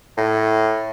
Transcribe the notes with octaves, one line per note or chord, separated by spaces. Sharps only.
A2